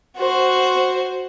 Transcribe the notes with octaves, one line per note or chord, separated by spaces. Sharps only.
F#4 C5